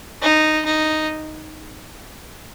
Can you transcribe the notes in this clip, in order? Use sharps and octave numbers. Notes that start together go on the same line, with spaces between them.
D#4
D#4